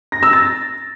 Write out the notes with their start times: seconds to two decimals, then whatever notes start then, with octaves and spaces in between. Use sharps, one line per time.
0.12 A#6
0.23 E6
0.33 A6